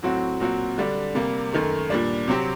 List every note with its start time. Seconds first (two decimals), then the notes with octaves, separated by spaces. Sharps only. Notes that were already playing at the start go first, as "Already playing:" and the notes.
0.03 A2 F#3 C4 F#4
0.40 A#2 F#3 C4 F#4
0.78 D3 G3 D4
1.15 C3 G3 A#3
1.52 F#2 D#3 A3
1.90 A#2 G3 D4
2.28 C3 F#3 C4 G4